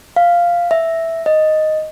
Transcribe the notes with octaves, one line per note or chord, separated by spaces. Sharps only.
F5
E5
D#5